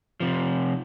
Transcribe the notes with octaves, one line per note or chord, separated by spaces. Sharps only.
C3 F3